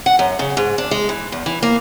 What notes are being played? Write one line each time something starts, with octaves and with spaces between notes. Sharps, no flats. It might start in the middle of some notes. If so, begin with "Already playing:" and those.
F#5
F#2
C#3
G#2
D4
G#3
E3
E2
E3
A#3